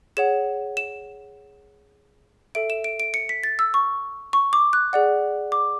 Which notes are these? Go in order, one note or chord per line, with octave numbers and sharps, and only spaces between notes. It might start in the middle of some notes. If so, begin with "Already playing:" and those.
G#4 C#5 F#5 E7
E7
A4 E5 D7
E7
D7
D7
C#7
B6
A6
E6
C#6
C#6
D6
F#6
G#4 D5 F#5
D6